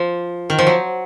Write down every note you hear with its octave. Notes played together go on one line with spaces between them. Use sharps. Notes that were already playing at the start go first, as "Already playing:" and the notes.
Already playing: F3
D#3
F3
F#3